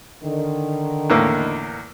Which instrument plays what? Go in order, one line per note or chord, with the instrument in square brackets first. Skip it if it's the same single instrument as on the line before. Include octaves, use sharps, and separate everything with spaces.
[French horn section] D3 D#3
[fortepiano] E2 A2 A#3